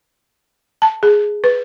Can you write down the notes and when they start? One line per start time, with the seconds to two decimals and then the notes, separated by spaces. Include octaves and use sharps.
0.82 A5
1.03 G#4
1.44 B4